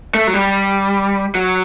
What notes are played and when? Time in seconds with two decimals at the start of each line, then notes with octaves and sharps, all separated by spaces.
0.14 A3
0.27 F#3
0.34 G3
1.35 F#3